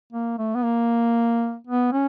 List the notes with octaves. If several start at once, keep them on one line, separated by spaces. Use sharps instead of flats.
A#3
A3
B3
A#3
B3
C#4